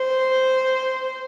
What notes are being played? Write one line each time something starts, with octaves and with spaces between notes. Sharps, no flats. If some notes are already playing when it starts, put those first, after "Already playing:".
Already playing: C5